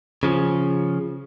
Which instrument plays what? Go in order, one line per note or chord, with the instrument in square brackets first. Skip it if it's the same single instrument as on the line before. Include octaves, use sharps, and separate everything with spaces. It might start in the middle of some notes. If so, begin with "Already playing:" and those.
[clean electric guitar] C#3 F3 C#4